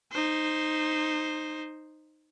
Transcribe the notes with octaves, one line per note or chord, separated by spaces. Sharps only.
D#4 C5